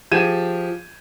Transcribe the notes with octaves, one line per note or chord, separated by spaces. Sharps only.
F3 G4 G#4 G#6 D#7 E7